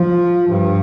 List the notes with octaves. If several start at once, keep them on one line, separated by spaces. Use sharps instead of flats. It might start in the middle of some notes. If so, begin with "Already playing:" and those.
Already playing: F3
G2